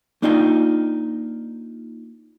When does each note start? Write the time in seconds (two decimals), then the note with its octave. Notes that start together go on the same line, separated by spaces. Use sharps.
0.22 A#3 D4 D#4 F4 G5